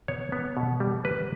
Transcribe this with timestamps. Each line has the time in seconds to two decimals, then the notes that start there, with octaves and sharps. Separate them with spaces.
0.08 B3 C#5
0.32 B3
0.57 B2
0.80 G3
1.04 A#3 B4